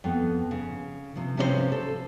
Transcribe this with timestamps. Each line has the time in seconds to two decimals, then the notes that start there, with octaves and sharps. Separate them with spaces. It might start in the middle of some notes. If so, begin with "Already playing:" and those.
0.04 F2 B3
0.51 C#3
1.16 C3 F3
1.37 C3 F3 C#4 E4 B4 C5
1.72 A4